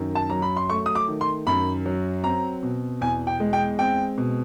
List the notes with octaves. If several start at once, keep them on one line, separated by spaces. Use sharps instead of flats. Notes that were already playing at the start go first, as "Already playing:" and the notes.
Already playing: F#2 D#3
A5
F#3 A#5
B5
C6
A3 C#6
D#6
D6
D#3
C6
F#2 B5
F#3
C4 A#5
B2
E2 G#5
G5
G#3
G5
C4 G5
B2